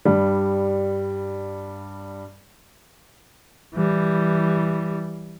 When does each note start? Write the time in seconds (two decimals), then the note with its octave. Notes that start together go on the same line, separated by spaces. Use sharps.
0.05 G2 G3
3.75 E3 G3